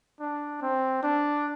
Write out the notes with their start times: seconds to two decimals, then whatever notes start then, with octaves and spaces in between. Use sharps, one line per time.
0.20 D4
0.62 C4
1.03 D4